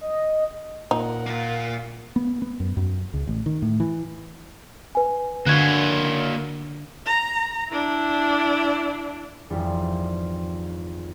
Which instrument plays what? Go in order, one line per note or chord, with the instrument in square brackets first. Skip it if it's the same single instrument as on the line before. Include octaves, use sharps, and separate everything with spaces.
[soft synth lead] D#5
[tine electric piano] A#2 [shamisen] D#4 [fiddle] A#4 F#5
[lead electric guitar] A#3 F4
[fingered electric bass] B3
B3
F#2
F#2
C#2
A1
D#3
A2
E3
[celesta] B4 G#5
[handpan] D3 [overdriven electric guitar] A#3 F#4 [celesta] F#6 G#6
[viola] A#5
D4 E4
[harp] G#1 F2 E3 G3 F4